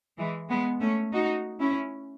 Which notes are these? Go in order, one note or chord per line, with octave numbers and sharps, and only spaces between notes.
E3 G#3
G#3 B3
A3 C#4
D#4 F#4
C#4 E4